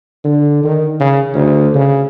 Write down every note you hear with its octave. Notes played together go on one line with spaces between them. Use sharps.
D3
D#3
C#3
D2
C#3